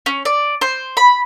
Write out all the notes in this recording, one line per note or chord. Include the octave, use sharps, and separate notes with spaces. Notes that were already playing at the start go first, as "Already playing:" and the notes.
C#4
D5
C5
B5